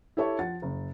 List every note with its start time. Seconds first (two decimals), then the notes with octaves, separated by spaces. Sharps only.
0.17 E4 G4 A4 C#5 E5 C#6
0.39 F3 F#5 A6
0.62 F#1